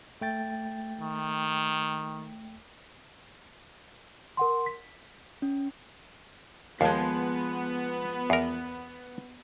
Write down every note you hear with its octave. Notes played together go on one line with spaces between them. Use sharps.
A3 G5 A6
D#3
A#4 F#5 C6
B6
C#4
D#2 F3 G#3 B3
E2 A#4